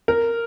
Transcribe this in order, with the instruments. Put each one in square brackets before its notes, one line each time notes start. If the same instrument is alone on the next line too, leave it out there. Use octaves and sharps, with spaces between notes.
[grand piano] A#4